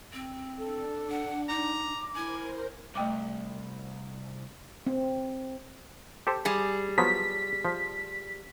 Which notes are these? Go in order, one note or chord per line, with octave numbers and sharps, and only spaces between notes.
C4
D4 A4
F#5
D#4 A#5 D6
E4 A#4 C5 G#5
C2 A3 G5 D6
C4
G4 A4 C5
G3 G#4
F3 F#3 B3 B6
F3